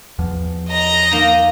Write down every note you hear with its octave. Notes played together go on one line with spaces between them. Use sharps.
E2 F3
D#5 A#5
A#3 D#4